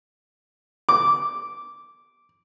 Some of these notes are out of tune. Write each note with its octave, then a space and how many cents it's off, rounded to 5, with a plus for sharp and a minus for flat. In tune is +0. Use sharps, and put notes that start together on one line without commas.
D6 -10